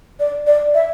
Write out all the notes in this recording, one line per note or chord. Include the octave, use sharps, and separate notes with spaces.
D5
D5
E5